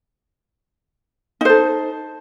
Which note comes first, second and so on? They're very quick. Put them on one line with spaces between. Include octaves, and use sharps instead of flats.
D#4 C5 A4